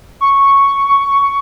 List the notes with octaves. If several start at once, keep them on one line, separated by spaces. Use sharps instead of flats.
C#6